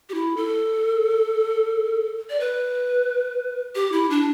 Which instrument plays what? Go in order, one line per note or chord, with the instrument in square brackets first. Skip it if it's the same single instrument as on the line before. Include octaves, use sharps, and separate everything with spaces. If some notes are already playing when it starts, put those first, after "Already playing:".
[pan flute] G4
E4
A4
D5
B4
G4
E4
D4